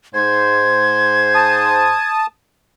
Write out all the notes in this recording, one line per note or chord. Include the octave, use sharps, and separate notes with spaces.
G#2 C5 G#6
A5 D#6